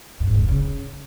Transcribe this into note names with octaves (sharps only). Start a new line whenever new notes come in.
F#2
G#2
B2
G2
C#3